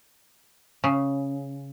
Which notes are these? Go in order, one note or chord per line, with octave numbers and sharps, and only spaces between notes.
C#3